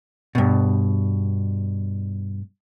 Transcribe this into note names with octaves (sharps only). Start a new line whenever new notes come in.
G2 B2